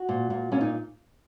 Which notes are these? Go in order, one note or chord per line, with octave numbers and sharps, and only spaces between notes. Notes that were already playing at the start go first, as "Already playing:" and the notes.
Already playing: F#4
A#2
A#2
A#2 C#4
D#4